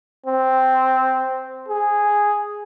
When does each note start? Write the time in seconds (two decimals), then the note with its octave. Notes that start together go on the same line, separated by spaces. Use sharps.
0.26 C4
1.69 G#4